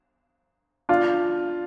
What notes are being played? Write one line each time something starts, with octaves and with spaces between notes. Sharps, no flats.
D4 F4